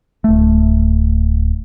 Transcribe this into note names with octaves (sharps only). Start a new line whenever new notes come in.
D1 A3